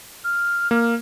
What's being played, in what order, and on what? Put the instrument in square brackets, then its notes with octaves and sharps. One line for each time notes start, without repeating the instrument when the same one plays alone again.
[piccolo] F6
[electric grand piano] A#3 [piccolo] F6